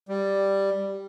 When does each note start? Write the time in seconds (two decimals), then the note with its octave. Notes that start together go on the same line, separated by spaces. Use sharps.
0.09 G3